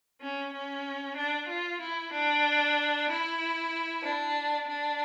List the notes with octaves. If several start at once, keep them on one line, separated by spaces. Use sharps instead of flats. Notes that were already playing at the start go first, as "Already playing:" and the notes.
C#4
C#4
D4
F4
E4
D4
E4
D4
D4